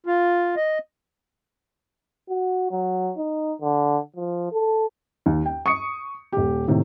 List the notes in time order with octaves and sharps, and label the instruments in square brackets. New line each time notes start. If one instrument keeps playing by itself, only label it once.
[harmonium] F4
D#5
[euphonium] F#4
F#3
D#4
D3
F3
A4
[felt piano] D#2
G5
C#6 D#6 C#7
D#1 G4
A2 C3 D#3